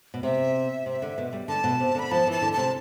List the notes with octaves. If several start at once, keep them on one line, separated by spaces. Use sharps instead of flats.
B2
C3 E5
C3
D3
B2
G3
D3 A5
B2
C3
D3 B5
F3 A5
E3 A5
D3
C3 A5